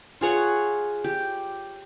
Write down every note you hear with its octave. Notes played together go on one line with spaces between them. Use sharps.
F4 G#4 C#5 F#5
G4